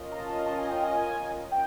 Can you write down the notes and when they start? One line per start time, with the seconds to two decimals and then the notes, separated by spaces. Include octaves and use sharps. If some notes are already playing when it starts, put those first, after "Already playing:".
Already playing: C#4 F4 A#4 D#5
0.12 A#5
0.19 A5
0.46 A5
0.57 G#5
0.70 G5
0.83 G#5
1.52 G5